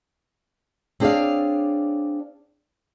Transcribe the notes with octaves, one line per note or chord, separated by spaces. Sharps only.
C4 D4 G#4 C#5 D5 F5